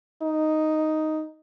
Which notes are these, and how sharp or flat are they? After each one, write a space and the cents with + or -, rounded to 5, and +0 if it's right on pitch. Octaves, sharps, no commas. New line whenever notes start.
D#4 +0